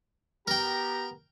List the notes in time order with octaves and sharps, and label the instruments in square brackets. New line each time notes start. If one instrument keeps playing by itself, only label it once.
[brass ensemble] B3 G4 A#5 [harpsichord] A#4 G5